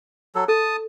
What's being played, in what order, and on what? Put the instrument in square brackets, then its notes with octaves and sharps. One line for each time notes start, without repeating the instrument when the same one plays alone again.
[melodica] F#3 A4
[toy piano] A4 [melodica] A5 D#6